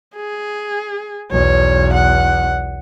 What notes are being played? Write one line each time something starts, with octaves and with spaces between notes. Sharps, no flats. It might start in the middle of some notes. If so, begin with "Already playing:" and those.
G#4
B1 E2 C#5
F#5